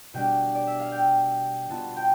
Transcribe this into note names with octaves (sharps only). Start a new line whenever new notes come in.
B2 G3 D4 G5
D5
E5
F5
G5
B2 B3 F4 A5
G5